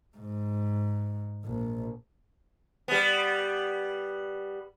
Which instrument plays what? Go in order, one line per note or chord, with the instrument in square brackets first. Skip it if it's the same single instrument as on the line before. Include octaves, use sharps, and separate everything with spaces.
[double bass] G#2
A#1
[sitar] G3 B3